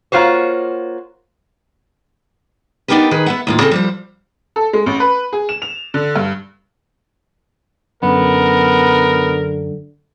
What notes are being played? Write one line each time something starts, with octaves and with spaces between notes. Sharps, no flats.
A#3 F4 F#4 C5 C#5
B3 D4 D#4 G4 A#4 B4
D#3 G#4 B4
B3 E5 F#5
D#2 A2 F4
C#3 C4 A4
F3 G3 C5
A4
G#3
A1
B4
G#4
E7
F7
D3
G2
F#2 D3 B3 A#4